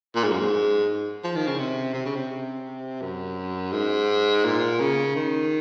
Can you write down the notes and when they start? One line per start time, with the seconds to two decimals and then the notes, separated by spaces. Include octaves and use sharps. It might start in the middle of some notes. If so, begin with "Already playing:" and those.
0.16 A#2
0.24 G#2
0.32 F#2
0.40 G#2
1.24 F3
1.36 D#3
1.47 C#3
1.59 C3
1.94 C3
2.05 C#3
2.16 C3
3.02 F#2
3.73 G#2
4.45 A#2
4.80 C#3
5.16 D#3